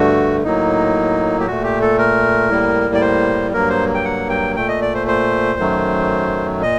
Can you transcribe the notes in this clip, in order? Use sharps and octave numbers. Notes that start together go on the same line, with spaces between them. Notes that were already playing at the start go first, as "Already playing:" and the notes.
Already playing: G2 D3 A3 F#4
A2 F#3 A#3 D#4
G4
A#2 A3 F#4
G4
A4
A#4
A2 G3 A#3
D5
C5
G2 F#3 A#3 A#4
C5
G5
F#5
G5
A#2 A3 G5
D#5
D5
C5
C5
F#2 D#3 F#3 A3
A#2 D#5